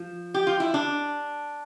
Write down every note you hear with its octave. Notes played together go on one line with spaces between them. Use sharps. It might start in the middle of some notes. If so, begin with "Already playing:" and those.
Already playing: F3
G4
F4
E4
D4